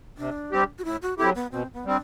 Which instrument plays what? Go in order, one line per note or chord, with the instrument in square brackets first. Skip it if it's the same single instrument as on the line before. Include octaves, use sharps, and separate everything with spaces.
[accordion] C3 [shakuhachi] D4
[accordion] G3 C4 G4
[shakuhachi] F#4
[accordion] A2 [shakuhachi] E4
[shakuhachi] F#4
[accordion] F#3 C4 E4 G4 [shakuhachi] A4
[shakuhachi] B3
[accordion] B2 [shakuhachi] C4
[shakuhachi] B3
[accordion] G3 C4 [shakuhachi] D4